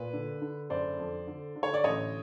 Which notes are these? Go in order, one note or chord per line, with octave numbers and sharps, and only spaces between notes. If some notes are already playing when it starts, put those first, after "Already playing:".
Already playing: A#2 B4
D3
D3
F#1 C5 D5
F2
D3
D3
C#5
D5
A1 C#5 D#5